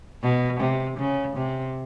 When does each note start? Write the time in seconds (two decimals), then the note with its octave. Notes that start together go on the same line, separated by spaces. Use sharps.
0.23 B2
0.60 C3
0.98 C#3
1.37 C3